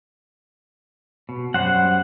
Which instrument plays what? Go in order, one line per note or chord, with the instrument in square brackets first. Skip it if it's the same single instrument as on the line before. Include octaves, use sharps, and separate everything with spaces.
[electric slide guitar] B2
[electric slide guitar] F#2 G3 C5 [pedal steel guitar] F#5